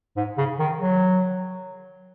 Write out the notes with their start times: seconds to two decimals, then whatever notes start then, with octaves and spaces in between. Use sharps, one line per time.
0.17 G#2
0.38 C#3
0.59 D#3
0.81 F#3